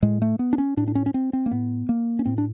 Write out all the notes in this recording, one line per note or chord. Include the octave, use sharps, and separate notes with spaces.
A2 G#3
A3
B3
D4
C#4
A2 D4
D4
C#4
C#4
C4
C4
A#3
A2 B3
A#3
C#4
A2 C4
D4